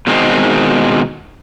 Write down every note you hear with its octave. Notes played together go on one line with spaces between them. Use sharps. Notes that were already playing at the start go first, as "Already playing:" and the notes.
B2 D#3 G#3 C4